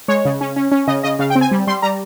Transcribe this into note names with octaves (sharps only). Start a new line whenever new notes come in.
G#3 C#5
C#3
C#4
C#4
C#4
C#3 D#5
C#3 D#5
C#3 F5
G5
C4
G#5
G3
G3 C6
G3 A#5